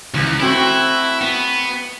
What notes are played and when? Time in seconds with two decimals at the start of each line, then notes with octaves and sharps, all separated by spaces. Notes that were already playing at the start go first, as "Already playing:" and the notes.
0.14 C#2 D#3
0.40 A3 C4 E4 F#4
1.22 B3